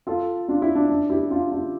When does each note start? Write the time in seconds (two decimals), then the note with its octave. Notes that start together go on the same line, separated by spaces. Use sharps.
0.07 F4 A4
0.48 D4 F4
0.62 E4
0.75 D4
0.90 D4
1.10 E4 G4
1.31 D4 F4
1.52 D4 F4